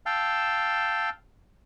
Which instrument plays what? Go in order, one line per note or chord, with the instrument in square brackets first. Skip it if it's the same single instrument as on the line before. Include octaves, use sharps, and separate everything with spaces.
[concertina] F5 G5 A5 E6